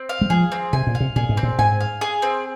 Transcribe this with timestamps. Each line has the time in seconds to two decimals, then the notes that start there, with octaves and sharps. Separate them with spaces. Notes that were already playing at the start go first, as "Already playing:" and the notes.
Already playing: C4
0.09 F5
0.21 G#3
0.30 F3 G#4
0.52 C4
0.73 C3 G#5
0.87 A#2
0.95 F5
1.00 C3
1.16 A#2 G#4
1.29 G#2
1.37 C4
1.43 A#2
1.59 G#2 G#5
1.80 F5
2.01 G#4
2.22 C4